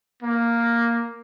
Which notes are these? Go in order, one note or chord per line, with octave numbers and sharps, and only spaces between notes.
A#3